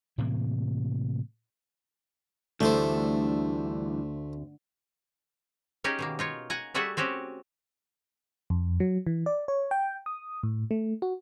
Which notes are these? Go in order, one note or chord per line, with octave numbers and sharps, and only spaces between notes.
A2 C3 E3 A#3
D2 D3 E3 G3 A3 A4 C5
C#4 D#4 G4 G#4 A#4
B2 D#3 A#3
D#4 F4 C#5
F#5 G#5 A#5
G3 A3 F#4 G#4 E5 F#5
C4 C#4 F#4 G4
F2
F#3
E3
D5
C#5
G5
D#6
A2
A3
F#4